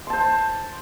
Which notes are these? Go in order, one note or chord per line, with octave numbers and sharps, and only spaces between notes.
C5 A5 C6